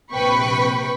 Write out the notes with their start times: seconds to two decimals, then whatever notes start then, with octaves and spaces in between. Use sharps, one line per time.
0.12 A#1 C3 B4 G5 B5 C#6